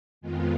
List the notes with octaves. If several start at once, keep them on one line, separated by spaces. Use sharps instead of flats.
F2 D#3 G#3 B3 F4